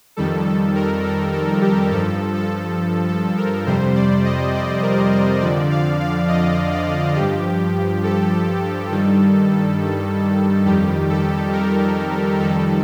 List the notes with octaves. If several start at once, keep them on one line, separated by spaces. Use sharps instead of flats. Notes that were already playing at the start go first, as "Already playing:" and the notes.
F2 D#3 G3 A4
A4
A#4
A4
A4
G4
G2 F3 A4
A4
A4
A#4
F2 C3 G3 C5
D5
D#5
D5
A#4
A#4
F2 D3 F3 D5
F5
F5
D#5
D5
G2 F3 G4
A4
G2 D#3 G3
F2 D#3 G3 G4
A4
A#4
F2 D#3 G3 A4